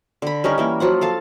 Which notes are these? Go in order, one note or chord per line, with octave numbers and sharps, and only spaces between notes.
D3 B5
G3 C#4 D#4 A#4
E3 A#3 A#4
F3 F#3 F4 F#5
A4 F5 A5